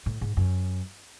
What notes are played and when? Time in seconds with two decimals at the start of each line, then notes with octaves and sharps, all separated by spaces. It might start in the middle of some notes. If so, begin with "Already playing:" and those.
0.06 A2
0.21 G#2
0.37 F#2